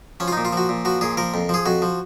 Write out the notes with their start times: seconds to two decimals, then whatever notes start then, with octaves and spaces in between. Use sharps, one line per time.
0.20 F3 C#4
0.28 F4
0.32 D#4
0.37 A#2
0.45 F4
0.53 F3 F#4
0.69 A#2
0.85 F3 F#4
1.01 A#2 G#4
1.17 F3 A#4
1.34 F2
1.49 F3 G#4
1.66 F2 F#4
1.82 F3